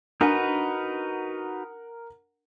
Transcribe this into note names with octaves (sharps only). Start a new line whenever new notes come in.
D4 D#4 F#4 A#4 B4 F#5